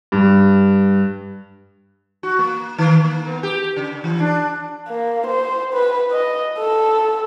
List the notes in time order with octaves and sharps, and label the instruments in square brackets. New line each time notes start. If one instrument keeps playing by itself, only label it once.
[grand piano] G2
[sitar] F#4
A#3
D#3
A#3
B3
G4
C#3
E3
D4
[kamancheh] A#3
C5
B4
D#5
A4